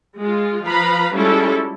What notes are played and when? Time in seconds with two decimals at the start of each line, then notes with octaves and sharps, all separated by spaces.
0.17 G#3 F4
0.64 F3 B4 F5 A#5 B5
1.13 G3 G#3 C#4 E4 F4 A4